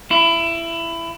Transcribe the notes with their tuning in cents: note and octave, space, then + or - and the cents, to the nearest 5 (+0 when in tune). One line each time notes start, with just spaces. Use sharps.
E4 +20